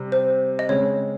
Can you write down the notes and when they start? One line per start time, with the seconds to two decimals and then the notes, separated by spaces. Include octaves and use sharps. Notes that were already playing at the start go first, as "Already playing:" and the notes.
Already playing: C3 G3 C4
0.12 C5
0.59 D#5
0.69 C#3 G#3 C4 C#5